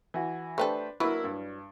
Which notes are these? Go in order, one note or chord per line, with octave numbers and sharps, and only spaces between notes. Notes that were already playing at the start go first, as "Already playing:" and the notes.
E3 F#4
A3 D4 G4 A4 B4 C5
F#3 A#3 D4 E4 B4
G2